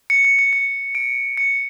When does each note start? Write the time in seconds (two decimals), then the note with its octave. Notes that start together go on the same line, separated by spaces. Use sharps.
0.10 C#7
0.25 C#7
0.39 C#7
0.53 C#7
0.95 D7
1.37 C#7